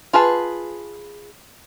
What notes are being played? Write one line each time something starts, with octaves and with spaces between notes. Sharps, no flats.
F4 G#4 B4 A5